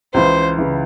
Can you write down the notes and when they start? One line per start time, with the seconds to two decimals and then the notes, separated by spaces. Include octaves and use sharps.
0.14 C#2 C#3 E3 C5
0.58 C#3 E3